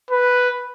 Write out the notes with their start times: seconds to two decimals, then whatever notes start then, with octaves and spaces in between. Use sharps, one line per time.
0.11 B4